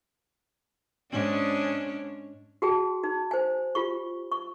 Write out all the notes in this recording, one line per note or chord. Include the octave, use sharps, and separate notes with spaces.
G#2 C#4 D4
F#4 G#4 G5 A5
D#4
C5 G#5
F4 G4 C#6
C#6